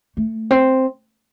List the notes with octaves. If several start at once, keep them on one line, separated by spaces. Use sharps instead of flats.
A3
C4